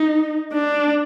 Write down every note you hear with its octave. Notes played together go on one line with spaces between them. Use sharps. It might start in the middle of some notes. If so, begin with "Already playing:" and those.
Already playing: D#4
D4